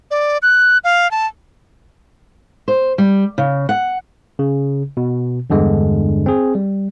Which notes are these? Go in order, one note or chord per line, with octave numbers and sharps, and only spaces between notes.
D5
F#6
F5
A5
C5
G3
C#3
F#5
C#3
B2
E2 G2 D3 G#3
C4 G#4
G3